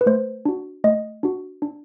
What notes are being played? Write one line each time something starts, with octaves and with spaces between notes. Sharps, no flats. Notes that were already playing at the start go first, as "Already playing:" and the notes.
B4
A3 C5
D4 F#4
A3 D#5
D4 F#4
D4